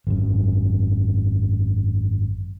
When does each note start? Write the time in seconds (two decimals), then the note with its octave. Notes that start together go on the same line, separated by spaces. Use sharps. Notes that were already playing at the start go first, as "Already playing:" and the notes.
0.07 G#1 F#2